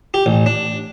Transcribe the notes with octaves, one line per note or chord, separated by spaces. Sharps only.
G4
A1
D4